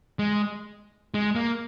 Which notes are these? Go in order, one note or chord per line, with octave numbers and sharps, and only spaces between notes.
G#3
G#3
A#3